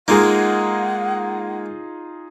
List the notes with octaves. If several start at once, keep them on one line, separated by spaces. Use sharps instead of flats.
G#3 A#3 D#4 F4 G#4 F#5